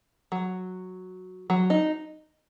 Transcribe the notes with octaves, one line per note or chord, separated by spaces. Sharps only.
F#3
F#3
D#4